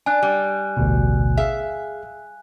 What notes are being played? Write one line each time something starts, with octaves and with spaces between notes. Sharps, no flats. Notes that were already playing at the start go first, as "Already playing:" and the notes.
D4 G#5 F#6
G3
A1 D2 B2
G#4 E5 F5